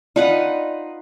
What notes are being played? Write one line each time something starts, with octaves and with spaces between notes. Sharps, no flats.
D#4 F4 B4 D5 F#5 A5